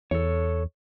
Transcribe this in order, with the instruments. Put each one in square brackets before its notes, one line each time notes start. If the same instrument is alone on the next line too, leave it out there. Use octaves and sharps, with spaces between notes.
[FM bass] E2 [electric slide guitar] A4 C#5